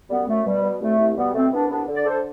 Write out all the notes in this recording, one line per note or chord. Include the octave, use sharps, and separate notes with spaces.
F#2 G3 B3
F#2 A3
B2 G3
B2
C2 A3
C2
B2 G3 B3
B2 A3 C4
C2 B3 D4
C2 B3 D4
D3
D5
D3 A4 C5